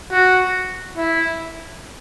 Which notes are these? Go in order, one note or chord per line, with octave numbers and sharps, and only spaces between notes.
F#4
E4